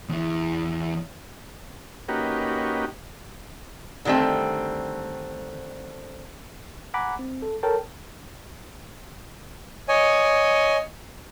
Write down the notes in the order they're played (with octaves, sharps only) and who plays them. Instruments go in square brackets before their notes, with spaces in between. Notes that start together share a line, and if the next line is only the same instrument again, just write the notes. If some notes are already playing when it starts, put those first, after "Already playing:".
[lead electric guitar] E2 E3
[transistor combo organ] A#3 C#4 D#4 F#4 G4 B4
[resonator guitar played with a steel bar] D3 D#3 G3 A3 C4
[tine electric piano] F#5 G#5 A#5 B5 D6 F#6
C4
A4
A4 A#4 C#5 G5 A5
[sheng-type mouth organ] C#5 D#5 G#5